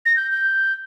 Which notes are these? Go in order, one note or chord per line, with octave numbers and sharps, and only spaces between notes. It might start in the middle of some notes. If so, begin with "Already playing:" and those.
A#6
G6
G6